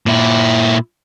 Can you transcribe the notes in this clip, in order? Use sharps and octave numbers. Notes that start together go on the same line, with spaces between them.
A#2 E4